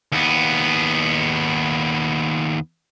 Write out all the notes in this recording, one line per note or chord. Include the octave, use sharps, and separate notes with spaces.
D#2 B3